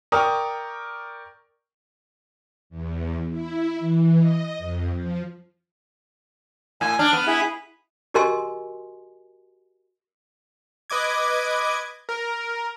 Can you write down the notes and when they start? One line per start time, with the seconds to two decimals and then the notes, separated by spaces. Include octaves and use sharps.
0.12 A#4 D5 G5 C#6 D#6 F6
2.70 E2
3.30 E4
3.80 E3
4.18 D#5
4.58 F2
4.93 F3
6.81 A2 G#5
6.99 D4 F6
7.13 B3
7.27 E4 G#4 E5
8.14 F#4 G4 A#4 D#5 G#5 C6
10.90 B4 D#5 D6 G#6
12.09 A#4